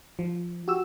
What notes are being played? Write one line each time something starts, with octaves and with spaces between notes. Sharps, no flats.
F3
F#4 G4 E6